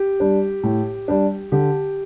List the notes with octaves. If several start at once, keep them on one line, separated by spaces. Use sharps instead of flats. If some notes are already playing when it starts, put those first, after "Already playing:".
Already playing: G4
G3 D4
A2
G3 D4
D3 G4